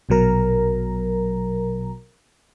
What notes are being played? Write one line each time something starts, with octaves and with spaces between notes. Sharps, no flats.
A#1 B2 F#3 A#4 A#5